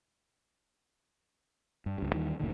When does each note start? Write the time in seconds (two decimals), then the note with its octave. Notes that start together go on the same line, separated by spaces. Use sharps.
1.86 G2
1.98 C#2 G2
2.13 D#2 D#3 E3 G3
2.40 F#1 D2 A#2 D#3